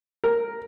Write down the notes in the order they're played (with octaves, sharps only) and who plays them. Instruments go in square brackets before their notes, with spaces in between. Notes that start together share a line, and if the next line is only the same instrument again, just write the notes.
[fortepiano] A#4